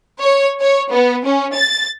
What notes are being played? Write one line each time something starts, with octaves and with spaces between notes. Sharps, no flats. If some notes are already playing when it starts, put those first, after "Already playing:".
C#5
C#5
B3
C#4
A6